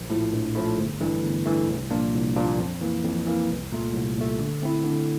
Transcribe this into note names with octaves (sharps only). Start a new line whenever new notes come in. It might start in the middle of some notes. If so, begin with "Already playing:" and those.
Already playing: A#1
A2 F3 A3 E4
A#1
A2 F3 A3 E4
G1
G2 E3 A3
G1
G2 E3 A3
C2
A#2 F3 A#3 D4
C2
A#2 F3 A#3 D4
F2
E3 A#3
F2
E3 A#3
C2
A#2 A3
C2
A#2 A3
D3
A3 C4 E4
D3